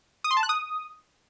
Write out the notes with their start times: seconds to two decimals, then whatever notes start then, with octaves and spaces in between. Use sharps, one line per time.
0.24 D#6
0.31 C6
0.37 A5
0.43 F#6
0.49 D#6